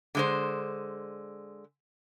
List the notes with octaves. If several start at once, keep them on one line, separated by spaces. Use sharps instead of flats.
D3 G#3 C5